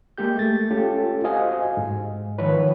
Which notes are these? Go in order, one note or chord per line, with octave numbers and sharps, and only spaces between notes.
G#3 A#3 G4 G6
A3 A6
C#4 F4 G4 A4
F#4 C5 D#5 F5 G#5
G#2
D#3 F3 B4 C#5